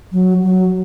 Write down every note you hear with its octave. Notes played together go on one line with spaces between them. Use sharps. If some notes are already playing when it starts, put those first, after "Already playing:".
F#3
F#3